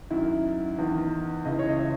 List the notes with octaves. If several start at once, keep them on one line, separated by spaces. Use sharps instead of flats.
F#2 D#3 E4
E2 D#3
C#2 C#3 E3 D#5
C#5
D#5
E5